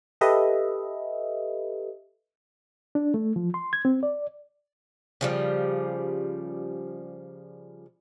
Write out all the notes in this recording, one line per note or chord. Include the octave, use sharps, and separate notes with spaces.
G4 A4 B4 D#5 E5
D4
A3
F3
C6
G#6
C4
D5
C#3 F3 G3